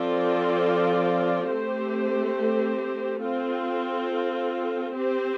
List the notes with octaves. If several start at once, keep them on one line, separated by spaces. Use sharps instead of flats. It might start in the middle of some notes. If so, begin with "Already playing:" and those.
Already playing: F3 C4 F4 A4 D5
A3 C4 G4 C5
C4 F4 A4
C4 G4 C5